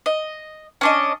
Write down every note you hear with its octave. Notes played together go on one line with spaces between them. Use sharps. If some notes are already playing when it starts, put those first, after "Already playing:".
D#5
C#4 D4 D#5